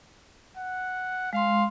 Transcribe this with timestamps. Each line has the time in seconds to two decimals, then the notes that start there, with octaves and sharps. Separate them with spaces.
0.57 F#5
1.33 G#3 F5 C6